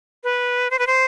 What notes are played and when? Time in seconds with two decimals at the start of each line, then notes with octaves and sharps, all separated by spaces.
0.24 B4
0.71 C5
0.79 B4
0.87 C5